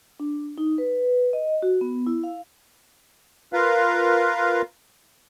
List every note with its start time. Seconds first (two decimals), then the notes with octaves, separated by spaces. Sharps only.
0.20 D4
0.58 D#4
0.78 B4
1.33 D#5
1.62 F#4
1.81 B3
2.07 E4
2.24 F5
3.53 F4 A#4 B4 F5